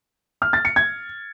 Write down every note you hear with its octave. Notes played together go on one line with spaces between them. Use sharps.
F6
A6
C#7
G#6